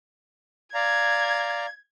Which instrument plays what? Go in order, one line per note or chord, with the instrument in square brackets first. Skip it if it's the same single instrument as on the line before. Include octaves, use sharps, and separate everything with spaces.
[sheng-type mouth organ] D5 F5 A#5 [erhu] G#6